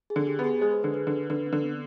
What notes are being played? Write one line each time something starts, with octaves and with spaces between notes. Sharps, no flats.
G#4
D3
G4
B3
G#4
G#3 C5
B4
D3 G#4
B4
D3
D3 B4
C4
D3
B3